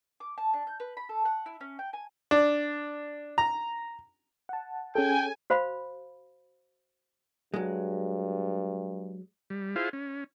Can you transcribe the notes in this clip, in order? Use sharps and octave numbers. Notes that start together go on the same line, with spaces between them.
D6
A5
D4
G6
B4
B5
A4
F#5
E4
C#4
G5
G#5
D4
A#5
F#5 A5
C#4 G#4 A4 G5 G#5
F#4 C5 F5 B5
G2 F#3 G#3
G3
E4 F4 G#4 C5 F5
C#4